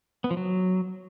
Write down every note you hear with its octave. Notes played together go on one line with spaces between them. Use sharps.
B3
F3
F#3